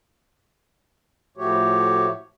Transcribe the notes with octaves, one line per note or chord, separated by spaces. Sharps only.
A2 F3 A3 F#4 G4 C#5